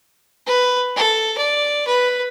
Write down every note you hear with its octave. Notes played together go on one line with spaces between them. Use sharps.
B4
A4
D5
B4